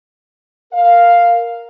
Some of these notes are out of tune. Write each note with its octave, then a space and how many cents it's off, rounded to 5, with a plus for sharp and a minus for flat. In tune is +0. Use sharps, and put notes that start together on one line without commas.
A#4 +0 F5 +0